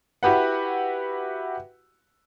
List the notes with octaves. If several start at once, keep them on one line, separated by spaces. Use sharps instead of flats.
E4 F#4 G4 B4 F#5